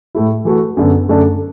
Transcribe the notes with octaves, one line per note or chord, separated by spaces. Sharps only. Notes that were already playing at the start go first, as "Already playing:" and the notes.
A2 A3 E4
E3 A3 F#4
F#2 D3 B3
F#2 D3 A3 D4